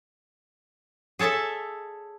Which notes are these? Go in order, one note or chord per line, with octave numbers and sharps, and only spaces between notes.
G#4 A4 C#5 E5 A5